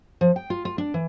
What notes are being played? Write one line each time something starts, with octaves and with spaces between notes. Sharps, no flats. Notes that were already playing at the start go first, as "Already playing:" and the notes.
F3
G5
F4
F4
D4
E3